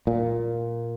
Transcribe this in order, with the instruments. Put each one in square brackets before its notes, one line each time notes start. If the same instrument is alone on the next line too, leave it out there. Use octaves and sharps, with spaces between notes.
[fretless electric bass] A#2